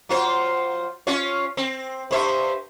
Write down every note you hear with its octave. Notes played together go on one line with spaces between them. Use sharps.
F#3 F4 C5
C#4 F4 C#5
C4
G2 C5 E5